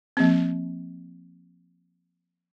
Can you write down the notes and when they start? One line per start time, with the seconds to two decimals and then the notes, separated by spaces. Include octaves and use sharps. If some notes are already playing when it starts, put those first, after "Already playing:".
0.17 F3 A#3 C4